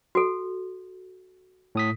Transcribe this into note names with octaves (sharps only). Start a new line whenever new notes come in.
F#4 A4
A2 D#6 B6